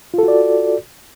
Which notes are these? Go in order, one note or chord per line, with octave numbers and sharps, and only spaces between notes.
F4 F#4 A4 D5